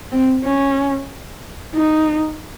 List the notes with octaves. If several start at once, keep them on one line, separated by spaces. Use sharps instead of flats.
C4
C#4
D#4